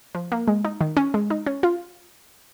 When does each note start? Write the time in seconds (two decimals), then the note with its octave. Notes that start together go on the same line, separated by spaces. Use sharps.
0.15 F3
0.32 A#3
0.48 G#3
0.64 D#4
0.81 D#3
0.97 C#4
1.14 G#3
1.30 D#4
1.47 C#4
1.63 F4